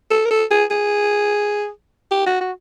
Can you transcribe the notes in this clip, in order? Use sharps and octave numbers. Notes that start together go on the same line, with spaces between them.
A4
A#4
A4
G#4
G#4
G4
F#4
F#4